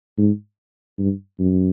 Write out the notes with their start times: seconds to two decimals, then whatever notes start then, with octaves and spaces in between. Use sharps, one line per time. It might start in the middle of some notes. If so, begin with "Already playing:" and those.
0.18 G#2
0.99 G2
1.40 F#2